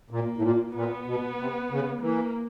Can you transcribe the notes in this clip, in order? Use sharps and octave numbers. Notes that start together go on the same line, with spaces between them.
A#2 A#3
A2
A#2
A#2 B3
B2
C3
C#3
E3 A#3